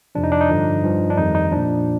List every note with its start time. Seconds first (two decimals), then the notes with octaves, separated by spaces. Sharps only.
0.15 F2 C3 F3 D4
0.23 D#4
0.32 D4
0.41 D#4
0.49 G2 D3 F3
0.84 G2 F3
1.10 D4
1.17 F2 D#3 G3 D#4
1.35 D#4
1.52 A#2 F3 D4